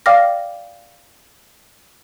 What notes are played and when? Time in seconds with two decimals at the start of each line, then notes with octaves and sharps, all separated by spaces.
0.06 D5 F5 G5 D6 F6 A#6